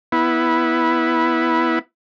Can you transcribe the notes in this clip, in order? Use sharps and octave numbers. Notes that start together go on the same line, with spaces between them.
B3 E4